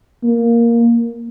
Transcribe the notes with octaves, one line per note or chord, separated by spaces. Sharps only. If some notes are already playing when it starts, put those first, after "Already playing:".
A#3